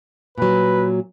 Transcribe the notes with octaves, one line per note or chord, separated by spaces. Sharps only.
A#2 F#3 B4